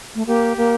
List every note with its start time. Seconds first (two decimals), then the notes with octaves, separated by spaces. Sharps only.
0.15 A3
0.26 A#3 G4
0.57 A#3